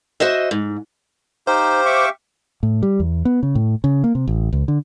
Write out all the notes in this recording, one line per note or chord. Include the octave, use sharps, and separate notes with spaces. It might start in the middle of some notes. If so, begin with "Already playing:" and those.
F#4 C5 D#5 E5
G#2
D#4 G4 C5 F5
E5 C#6 D6
A2
G3
E2
B3
C#3
A2
C#3
A#3
C3
A1
C#2
D3